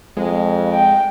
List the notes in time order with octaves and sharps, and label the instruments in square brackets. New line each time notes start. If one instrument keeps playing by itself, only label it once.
[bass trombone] F2 [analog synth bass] G#3
[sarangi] G5